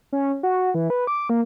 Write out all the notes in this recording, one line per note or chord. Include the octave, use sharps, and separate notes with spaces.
C#4
F#4
E3
B4
D6
A#3